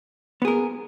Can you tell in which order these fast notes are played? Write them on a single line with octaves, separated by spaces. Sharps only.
B3 G#4 A#4